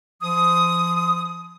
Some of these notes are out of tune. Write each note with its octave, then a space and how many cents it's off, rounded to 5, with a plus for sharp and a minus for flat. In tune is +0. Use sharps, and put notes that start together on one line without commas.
F3 -25 D#6 +5